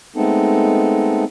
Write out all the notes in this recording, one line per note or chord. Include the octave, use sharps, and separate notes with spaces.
G#3 A3 B3 C4 D#4 A4